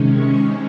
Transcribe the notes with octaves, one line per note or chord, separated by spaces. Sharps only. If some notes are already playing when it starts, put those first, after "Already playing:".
Already playing: C3 D#3 G#3 C#4
C#6